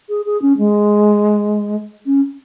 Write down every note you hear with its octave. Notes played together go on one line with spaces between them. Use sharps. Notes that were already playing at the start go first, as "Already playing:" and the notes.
G#4
G#4
C#4
G#3
C#4